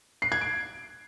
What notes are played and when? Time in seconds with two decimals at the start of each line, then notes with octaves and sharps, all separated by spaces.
0.22 C7
0.32 G#6
0.41 D7